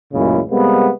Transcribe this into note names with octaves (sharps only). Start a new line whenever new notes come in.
A1 F#2 A#2 C#3 G#3 E4
C3 G3 G#3 A#3 B3